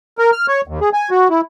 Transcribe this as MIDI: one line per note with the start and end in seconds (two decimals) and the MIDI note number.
0.18 0.31 70
0.32 0.46 89
0.48 0.61 73
0.67 0.80 39
0.81 0.89 68
0.93 1.10 80
1.11 1.28 66
1.30 1.41 64